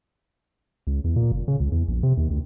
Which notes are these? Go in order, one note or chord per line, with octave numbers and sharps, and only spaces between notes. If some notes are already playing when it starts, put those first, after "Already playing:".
C#2
E2
A#2
F#1
C#3
C#2
E2
A#1
C3
D#2
D2